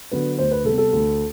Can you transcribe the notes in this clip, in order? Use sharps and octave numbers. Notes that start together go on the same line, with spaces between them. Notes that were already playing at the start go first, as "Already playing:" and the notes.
D3 F#3 B3 B4
D2 C5
B4
C3 G3 B3 A4
A4
D2